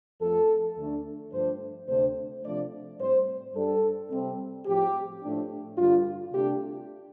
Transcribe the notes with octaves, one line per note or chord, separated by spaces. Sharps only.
F2 F3 A3 A4
D2 D3 A3 D4
G2 F3 A3 D4 C5
D2 C3 A3 D4 C5
C3 F3 A3 D4 D5
A2 G3 C4 C5
G2 G3 D4 A4
C3 G3 C4
A2 F3 C4 G4
A2 F3 A3 D4
G2 D3 G3 F4
C3 A3 D4 G4